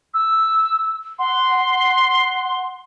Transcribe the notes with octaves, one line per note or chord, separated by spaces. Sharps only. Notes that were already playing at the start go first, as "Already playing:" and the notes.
E6
F#5 C6